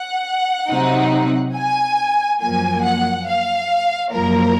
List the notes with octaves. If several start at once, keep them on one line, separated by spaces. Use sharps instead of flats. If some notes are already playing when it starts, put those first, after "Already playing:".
Already playing: F#5
C3 F#3 C4 D#4
G#5
F#2 F3 A#3 G#5
F#5
F5
F#2 F3 A#3 A#4